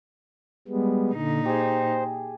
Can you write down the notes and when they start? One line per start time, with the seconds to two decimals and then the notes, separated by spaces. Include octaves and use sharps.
0.68 G3 G#3 B3
1.13 A#2 D3 D#4
1.45 G4 G#4 C5